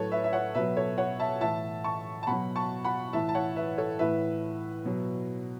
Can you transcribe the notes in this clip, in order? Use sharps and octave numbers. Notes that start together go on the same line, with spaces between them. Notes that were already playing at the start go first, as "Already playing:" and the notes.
Already playing: A2 F#3 A4 B4 C#5
B4 E5
E5
C#5 F#5
B2 F#3 B4 E5
A4 C#5
C#5 F#5
E5 A5
A2 E3 E5 A5
A5 C#6
A5
B2 F#3 F#5 B5
A5 C#6
F#5 B5
A2 E3 E5 A5
A5
C#5 F#5
B4 E5
A4 C#5
A2 E3 B4 E5
B2 F#3